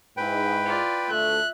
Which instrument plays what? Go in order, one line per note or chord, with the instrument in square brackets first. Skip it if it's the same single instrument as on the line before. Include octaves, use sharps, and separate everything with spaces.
[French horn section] G#2 [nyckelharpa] E4 [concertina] B4 G5
[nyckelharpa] F4 D5
[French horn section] D2 A3 [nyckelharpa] E5 [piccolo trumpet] F#6